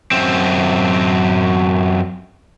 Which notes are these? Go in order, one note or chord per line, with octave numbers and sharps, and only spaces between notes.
F#2 C4